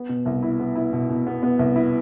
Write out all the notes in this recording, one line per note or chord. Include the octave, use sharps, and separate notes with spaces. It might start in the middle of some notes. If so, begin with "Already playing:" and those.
Already playing: B3
B2
C2
E4
B3
E4
B2
B2
B3
B3
C2
E4